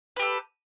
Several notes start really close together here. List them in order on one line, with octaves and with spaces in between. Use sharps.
B4 G4 A4